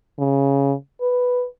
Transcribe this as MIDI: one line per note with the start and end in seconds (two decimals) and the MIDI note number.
0.19 0.73 49
1.01 1.45 71